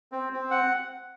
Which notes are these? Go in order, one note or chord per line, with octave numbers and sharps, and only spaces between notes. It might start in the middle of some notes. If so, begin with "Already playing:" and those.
C4
C4
F#5